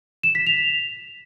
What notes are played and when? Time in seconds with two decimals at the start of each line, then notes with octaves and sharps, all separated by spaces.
0.23 E7
0.35 B6
0.47 F7